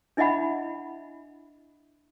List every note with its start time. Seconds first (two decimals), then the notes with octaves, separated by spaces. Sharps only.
0.17 D4 E4 D#5 E5 F#5 B5